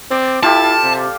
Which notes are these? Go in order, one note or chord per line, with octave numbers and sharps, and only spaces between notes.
C4 D5
E4 F4 G4 A4 A5
C3